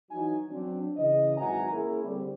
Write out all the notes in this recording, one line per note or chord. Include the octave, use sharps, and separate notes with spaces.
E3 F#3 D#4 G#5
F#3 C4 D4
C#3 E3 D#5
G#1 E3 F#3 F#5 G#5 A#5
A#3 C#4 E4 G#4 A#4
D3 G3 C4